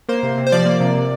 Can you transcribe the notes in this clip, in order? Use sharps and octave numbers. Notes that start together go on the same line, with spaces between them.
A#3 C5
C3
C3
C5
F3 D5
A#3
C3
C3